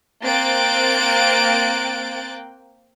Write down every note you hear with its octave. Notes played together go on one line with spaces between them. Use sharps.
A#3 C4 G5 F#6 A6 D7